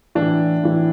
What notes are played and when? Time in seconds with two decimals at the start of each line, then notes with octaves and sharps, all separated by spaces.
0.15 A2 E3 D4
0.63 A2 E3